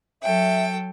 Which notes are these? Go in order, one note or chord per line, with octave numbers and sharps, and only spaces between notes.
F#3 A4 E5 G5